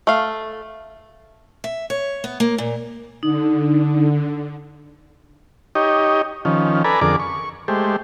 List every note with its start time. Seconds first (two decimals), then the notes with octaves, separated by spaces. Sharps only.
0.07 A3 F5
1.64 E5
1.90 C#5
2.24 B3
2.40 A#3
2.58 A#2
3.23 D3 D#4
5.75 D#4 G4 C#5 D#5
6.45 D#3 F3 C#4
6.84 A4 B4 D5 G#5 A#5 B5
7.01 F2 D3 G#4 A#4 D5 D6
7.20 C#6
7.68 G#3 A3 G4 C5